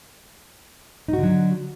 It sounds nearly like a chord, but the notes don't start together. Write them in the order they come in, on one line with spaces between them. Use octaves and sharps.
D#4 F#4 D3 F#3